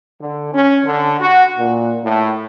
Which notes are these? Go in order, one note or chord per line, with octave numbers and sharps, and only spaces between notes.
D3
C#4
D3
F#4
A#2
A2